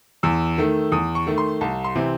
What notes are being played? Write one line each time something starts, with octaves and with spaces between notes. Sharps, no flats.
E2 E6
D#3 A3
E2 D#6
C#6
D#3 A3
C6
C2 A5
C6
C3 E3 C4